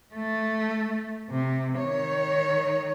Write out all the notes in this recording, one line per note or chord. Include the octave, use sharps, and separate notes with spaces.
A3
C3
D#3 C#5